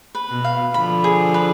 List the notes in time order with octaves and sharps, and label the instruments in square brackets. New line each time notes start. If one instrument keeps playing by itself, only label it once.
[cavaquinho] B4
[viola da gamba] B2
[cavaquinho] F5
[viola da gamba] D3 F3 [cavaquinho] B5
[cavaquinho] G#4
B4